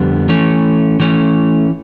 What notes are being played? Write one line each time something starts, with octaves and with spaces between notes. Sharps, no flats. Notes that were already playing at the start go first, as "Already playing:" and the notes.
Already playing: F2 D3 G3 B3
E3 A3 C#4
E3 A3 C#4